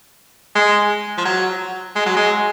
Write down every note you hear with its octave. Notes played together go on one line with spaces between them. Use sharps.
G#3
F3
F#3
G#3
F#3
G#3